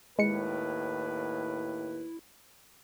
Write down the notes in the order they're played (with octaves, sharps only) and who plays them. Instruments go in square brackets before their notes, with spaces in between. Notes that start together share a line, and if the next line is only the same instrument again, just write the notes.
[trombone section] D#2 A2 B4 [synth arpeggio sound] G#3 C#7 [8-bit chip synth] E4